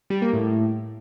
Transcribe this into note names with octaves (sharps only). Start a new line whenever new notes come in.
G3
A#3
A2